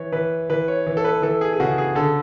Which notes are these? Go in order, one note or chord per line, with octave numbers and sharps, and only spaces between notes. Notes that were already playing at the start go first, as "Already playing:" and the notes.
Already playing: E3 C#5
E3 B4
E3 B4
C#5
E3
A4
B4
E3 A4
G#4
G#4
C#3 F#4
G#4
D3 A4